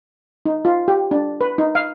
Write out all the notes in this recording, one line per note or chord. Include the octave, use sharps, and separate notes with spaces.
D#4
F4
G4
D4
B4
D#4
F5